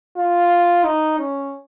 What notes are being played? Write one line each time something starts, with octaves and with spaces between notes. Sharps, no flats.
F4
D#4
C#4